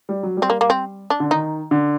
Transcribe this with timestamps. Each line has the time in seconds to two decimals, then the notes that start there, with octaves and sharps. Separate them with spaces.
0.09 G3
0.23 F#3
0.37 G3
0.42 C4
0.50 A#3
0.61 A#3
0.70 C4
1.10 D4
1.20 D3
1.31 D#3 D#4
1.71 D3